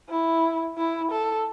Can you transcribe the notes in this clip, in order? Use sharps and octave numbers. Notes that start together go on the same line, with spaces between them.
E4
E4
A4